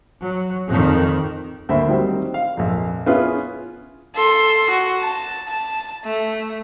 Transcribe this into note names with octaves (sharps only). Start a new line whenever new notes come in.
F#3
F2 D#3
D2 A#3 C5 E5 B5
D#3 F#3 G3 C4
F5
A#1 F2
B3 C#4 E4 F4 G#4 B4
A4 C6
F#4
A5
A5
A3